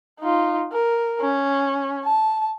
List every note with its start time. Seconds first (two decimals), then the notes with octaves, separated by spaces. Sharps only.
0.20 D#4 F4
0.72 A#4
1.21 C#4
2.03 A5